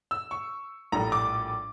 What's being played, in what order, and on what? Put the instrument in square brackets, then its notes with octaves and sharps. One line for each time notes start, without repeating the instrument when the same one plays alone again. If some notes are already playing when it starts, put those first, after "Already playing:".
[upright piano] E6
C#6
A#1 A2 G3 A#5
D6